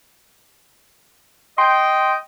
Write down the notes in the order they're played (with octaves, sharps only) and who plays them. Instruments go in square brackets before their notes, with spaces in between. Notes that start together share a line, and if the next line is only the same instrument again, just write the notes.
[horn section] D#5 G5 [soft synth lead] C6